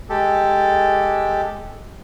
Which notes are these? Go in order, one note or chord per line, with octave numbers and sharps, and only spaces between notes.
G#3 G4 A4